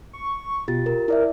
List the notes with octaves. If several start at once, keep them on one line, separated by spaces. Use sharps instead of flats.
C#6
B2 F4 G4 A6
A#4
E4 A#4 D5 E5